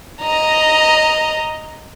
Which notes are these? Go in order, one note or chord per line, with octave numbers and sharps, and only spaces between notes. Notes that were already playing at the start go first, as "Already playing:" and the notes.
D#5 A#5